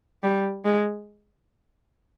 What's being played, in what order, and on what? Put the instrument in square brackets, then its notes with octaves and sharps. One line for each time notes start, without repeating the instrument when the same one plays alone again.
[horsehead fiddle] G3
G#3